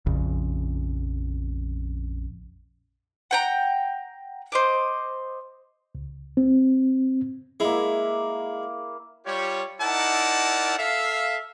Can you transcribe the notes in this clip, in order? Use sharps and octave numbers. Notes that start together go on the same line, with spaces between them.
A#1 F2 C#3
F#5 G5 A#5
C5 D#5 D6
C#2
C4
G#3 A#3 E4
G3 F4 G4 C#5
D#4 E4 A#4 D5 F#5 A5
A4 E5 F5